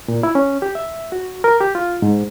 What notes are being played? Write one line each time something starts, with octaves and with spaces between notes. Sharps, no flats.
A#2
E4
C#4
G4
E5
F#4
A#4
G4
F4
G#2